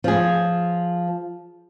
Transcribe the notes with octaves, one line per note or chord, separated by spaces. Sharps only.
F3 G#4